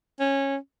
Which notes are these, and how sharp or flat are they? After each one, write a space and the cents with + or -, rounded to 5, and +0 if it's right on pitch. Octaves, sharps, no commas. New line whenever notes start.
C#4 -15